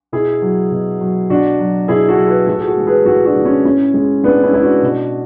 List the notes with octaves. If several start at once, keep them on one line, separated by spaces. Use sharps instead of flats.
B2 E4 G#4
F#3
B2
F#3
B2 D4 F#4
F#3
B2 E4 G#4
F#4 A4
F#3
G#4 B4
A2 F#4 A4
G#4
F#4 A4
E3 G#3
G#4 B4
A2 F#4 A4
D4 F#4
E3 G#3
C#4 E4
A2 C#4 E4
G#3
A2 B3 D4
C#4 E4
G#3 E4
D4 F#4
B2